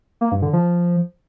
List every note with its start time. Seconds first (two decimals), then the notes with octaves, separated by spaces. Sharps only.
0.21 A#3
0.32 G2
0.42 D3
0.53 F3